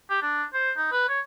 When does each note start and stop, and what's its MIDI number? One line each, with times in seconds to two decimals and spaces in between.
0.10 0.21 67
0.22 0.44 62
0.53 0.72 72
0.77 0.89 63
0.92 1.05 71
1.09 1.21 73